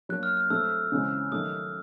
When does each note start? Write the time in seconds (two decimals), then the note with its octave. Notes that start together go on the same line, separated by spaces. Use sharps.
0.09 F#3 A#3 D4 F#6
0.23 F6
0.37 F6
0.50 F#3 A3 C4 E6
0.92 C#3 E3 G#3 C4
1.32 D#3 F#3 A3 D#6